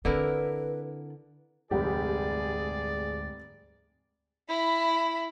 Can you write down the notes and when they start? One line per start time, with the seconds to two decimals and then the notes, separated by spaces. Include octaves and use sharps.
0.05 D3 C4 D4 E4 A#4 B4
1.71 F1 D2 G#2 G3 G4 G#4 D5
4.49 E4 B5